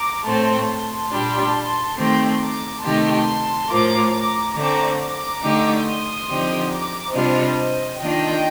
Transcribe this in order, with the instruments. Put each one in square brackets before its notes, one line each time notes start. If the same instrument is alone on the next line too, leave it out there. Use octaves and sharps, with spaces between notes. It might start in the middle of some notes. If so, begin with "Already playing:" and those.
Already playing: [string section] A#5 D6
[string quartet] A2 A3 C4 [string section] A5 C6
[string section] A5 C6
[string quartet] A#2 G3 D4 G4
D#3 A3 C4 G4
[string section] A#5 D6
[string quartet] C3 D#3 A3 D#4 G4 [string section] A5 C6
[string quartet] A2 F3 A#3 F4 [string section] A#5 D6
[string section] A#5 D6
[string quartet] D3 A3 C4 [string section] A#5 D6
[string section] A#5 D6
[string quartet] D3 A3 D#4 G4
[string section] C6 D#6
[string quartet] D3 F3 C4 D#4 G4
[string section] A#5 D6
[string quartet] C3 G3 D4 F4 [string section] C5 D#5
[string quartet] D#3 A#3 D4 F4 [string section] D#5 G5